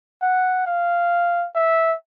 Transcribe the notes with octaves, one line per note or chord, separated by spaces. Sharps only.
F#5
F5
E5